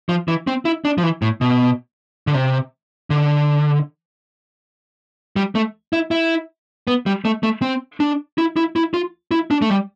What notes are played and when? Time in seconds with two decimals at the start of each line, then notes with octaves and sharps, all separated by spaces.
0.09 F3
0.28 E3
0.47 C4
0.65 E4
0.85 D4
0.98 F3
1.03 E3
1.22 A2
1.41 B2
2.27 D3
2.34 C3
3.10 D3
5.36 G3
5.55 A3
5.93 E4
6.11 E4
6.87 B3
7.06 G3
7.25 A3
7.43 A3
7.62 C4
8.00 D4
8.38 E4
8.56 E4
8.76 E4
8.94 F4
9.31 E4
9.51 D4
9.62 A3
9.70 G3